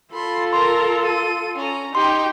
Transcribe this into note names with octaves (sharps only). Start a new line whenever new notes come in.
F4 A4 B5 C6
A#4 A#5 C6
D#7
C#4 A#5
D#4 G4 G5 C6